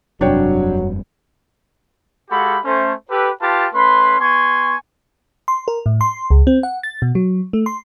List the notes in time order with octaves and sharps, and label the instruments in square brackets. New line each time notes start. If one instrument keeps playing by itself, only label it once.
[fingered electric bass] F1 G2 C3 [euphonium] F#3 [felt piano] D4 C#5 G5
[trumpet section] G#3 F#4 G4 A4 F5 B5
A3 C#4 C5
G4 A4 B4
F4 G4 B4 A5
A3 C#4 B4 B5 C6
B3 G#5 C6 C#6
[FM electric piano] C6
A#4
A2
C6
C#2
C4
F#5
A6
B2
F#3
A3
C6